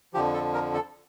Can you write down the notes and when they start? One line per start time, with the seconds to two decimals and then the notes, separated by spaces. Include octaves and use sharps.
0.14 F2 D3 F3 G4
0.33 A4
0.54 A#4
0.74 A4